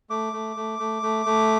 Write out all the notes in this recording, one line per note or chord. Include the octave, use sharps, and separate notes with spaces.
A3 D6
A3
A3
A3
A3
A3